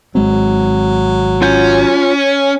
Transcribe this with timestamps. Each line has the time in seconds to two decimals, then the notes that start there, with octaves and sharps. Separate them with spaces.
0.15 G#1 F#3 G#3 C4
1.42 C#4 F4 F#5 G6